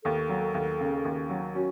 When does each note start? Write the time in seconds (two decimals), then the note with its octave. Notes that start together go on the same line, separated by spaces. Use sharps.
0.04 D#2 A4
0.29 F#3
0.54 D#2
0.80 C#3
1.05 D#2
1.29 F#3
1.55 C#4 F#4